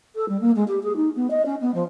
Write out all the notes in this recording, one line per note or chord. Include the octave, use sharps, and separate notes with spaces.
A4
G3
A#3
G#3
G4
G#4
D#4
B3
D#5
C#4
B3
F3